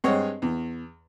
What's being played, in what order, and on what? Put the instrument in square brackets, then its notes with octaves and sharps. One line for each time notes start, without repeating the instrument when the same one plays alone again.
[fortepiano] G2 G#3 C4 C#5 D#5 F#5
E2